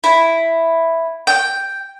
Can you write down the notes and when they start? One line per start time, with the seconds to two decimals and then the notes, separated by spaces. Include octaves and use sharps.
0.04 E4
1.27 G5